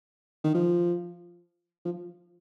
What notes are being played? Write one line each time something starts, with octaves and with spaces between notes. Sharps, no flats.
D#3
F3
F3